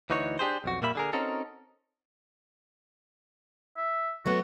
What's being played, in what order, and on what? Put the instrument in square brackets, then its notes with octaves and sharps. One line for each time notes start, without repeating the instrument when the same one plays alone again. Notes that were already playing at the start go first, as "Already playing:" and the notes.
[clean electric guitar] D2 E3 D#4 F#4 C#5
D4 G4 G#4 C5
B1 F2 F#4
A#2 G3 A#3 E5 B5
D3 G#4 A#4
C4 C#4 D#4 F#4 A4 A#4
[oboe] E5
[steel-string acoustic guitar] F#3 A3 B3 [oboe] F#4